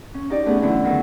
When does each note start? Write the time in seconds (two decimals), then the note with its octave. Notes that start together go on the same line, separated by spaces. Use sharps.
0.14 C#4
0.30 D#4 G4 D5
0.46 A3 B3 C#4 G#4
0.62 D3 E3 F#3 B3 C#4 E4
0.84 D#3 E3 F#3